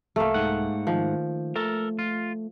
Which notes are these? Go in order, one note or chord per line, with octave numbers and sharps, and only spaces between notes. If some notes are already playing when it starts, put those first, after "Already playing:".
C2 A3 A#3
G#2 F#5
D#3 F3
A3 A4 A#4
F4